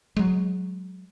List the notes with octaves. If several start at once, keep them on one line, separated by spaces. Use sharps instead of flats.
F#3 G#3